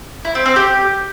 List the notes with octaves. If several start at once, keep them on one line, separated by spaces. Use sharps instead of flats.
E4
C4
C4
G4